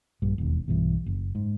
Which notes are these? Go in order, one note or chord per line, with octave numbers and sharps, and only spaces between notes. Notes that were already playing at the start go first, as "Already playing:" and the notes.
A#1 G2
E1 D#2
B1 G2 E3
F#1
G#2